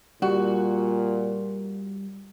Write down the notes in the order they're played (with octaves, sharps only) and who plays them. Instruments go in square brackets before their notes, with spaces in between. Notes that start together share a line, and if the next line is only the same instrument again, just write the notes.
[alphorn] A#2 [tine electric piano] G3 [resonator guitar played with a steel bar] F#4